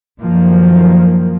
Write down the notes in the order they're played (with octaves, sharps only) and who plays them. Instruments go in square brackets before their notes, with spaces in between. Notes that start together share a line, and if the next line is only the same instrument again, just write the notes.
[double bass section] F#2 D#3 F3 A#3